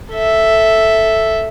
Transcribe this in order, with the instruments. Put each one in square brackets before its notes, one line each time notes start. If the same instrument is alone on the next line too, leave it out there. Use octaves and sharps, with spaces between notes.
[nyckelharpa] A4 E5